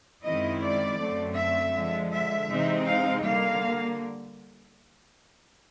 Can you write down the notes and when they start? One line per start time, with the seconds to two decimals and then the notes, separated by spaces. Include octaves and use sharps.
0.24 F#2 D#3 G#3 C4 E4 D#5
0.61 D5
0.99 F#2 D3 F#3 A3 C4
1.37 E5
1.74 D3 F3 G#3
2.12 E5
2.50 C3 E3 G#3 C4 D#4
2.87 F5
3.24 D3 G3 A#3 F5